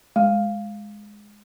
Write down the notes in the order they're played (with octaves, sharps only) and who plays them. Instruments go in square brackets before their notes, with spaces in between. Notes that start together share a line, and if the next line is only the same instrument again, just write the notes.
[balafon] G#3